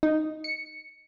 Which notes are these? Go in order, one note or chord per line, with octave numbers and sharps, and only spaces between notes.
D#4
C#7